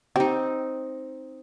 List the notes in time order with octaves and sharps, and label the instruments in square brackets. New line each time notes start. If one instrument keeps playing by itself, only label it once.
[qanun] C4 D#4 [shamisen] G4